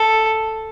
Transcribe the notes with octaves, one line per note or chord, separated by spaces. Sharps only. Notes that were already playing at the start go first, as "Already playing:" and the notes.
Already playing: A4